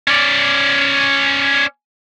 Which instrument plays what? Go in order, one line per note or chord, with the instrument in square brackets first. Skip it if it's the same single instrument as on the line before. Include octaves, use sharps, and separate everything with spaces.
[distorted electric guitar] C#4 D5